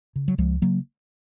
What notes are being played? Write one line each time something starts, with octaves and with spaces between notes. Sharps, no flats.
C#3
F#3
C#2 F3 G#3
C#3 F#3 A#3